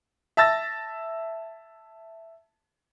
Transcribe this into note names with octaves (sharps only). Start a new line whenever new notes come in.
E5 A5 E6 A6 A#6